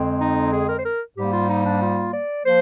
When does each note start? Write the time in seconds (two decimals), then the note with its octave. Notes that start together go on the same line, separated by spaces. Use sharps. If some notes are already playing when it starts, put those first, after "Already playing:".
Already playing: F2 D3 G#3 C4
0.21 D#4
0.53 G#4
0.69 A#4
0.79 C5
0.86 A#4
1.18 G#2 G3 A#3 G4
1.33 F4
1.50 D#4
1.66 D4
1.82 F4
2.14 D5
2.45 F3 A#3 C5